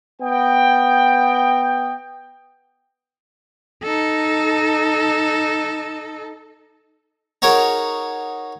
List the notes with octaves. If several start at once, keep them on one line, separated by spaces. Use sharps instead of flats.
B3 D#5 G5
D#4 A4
D#4 F#4 G#4 A#4 C#5